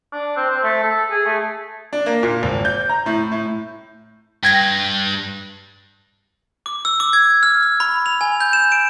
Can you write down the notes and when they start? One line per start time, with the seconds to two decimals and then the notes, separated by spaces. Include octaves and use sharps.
0.13 D4
0.37 C4
0.50 C4
0.63 A3
0.84 A4
1.11 G#4
1.26 A3
1.93 D4
2.06 A#3
2.23 A#2
2.43 G#1
2.65 G6
2.89 A#5
3.06 A2
3.32 A2
4.43 G2 G5 G#6 A#6
6.66 D6
6.85 E6
7.00 D6
7.13 G#6
7.43 F6
7.63 F6
7.80 B5
8.06 F7
8.21 G#5
8.40 G6
8.53 E7
8.72 D7